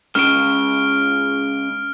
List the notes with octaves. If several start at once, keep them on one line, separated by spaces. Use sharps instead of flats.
C#3 G#3 F6 D7